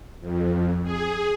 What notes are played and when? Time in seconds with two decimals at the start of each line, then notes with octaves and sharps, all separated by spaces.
0.21 F2
0.83 G#4